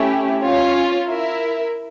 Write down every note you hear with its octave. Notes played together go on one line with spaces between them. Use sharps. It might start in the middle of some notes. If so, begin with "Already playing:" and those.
Already playing: A3 C#4 E4 G4
C#4 F4 C#5
E4 A#4 E5